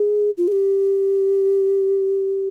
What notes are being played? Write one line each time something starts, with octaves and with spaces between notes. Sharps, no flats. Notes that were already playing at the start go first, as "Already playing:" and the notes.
Already playing: G#4
F4
G#4
G4